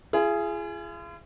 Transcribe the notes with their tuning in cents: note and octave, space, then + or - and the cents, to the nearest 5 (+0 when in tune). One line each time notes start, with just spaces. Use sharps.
F4 -45 G#4 +5